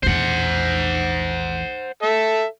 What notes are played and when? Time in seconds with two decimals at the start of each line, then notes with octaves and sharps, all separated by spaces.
0.03 A#1 E2 C5 F#5
2.03 A4 E5